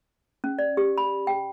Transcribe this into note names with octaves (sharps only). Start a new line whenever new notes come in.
C#4
D5
G4
B5
G5